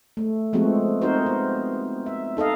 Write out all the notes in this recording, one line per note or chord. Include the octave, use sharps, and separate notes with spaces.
A3
F3 G#3 A3 B3 C4 F#4
C4 D#4 F#4 A#4 C5
B3
E5
D#4 A4 D#5 F5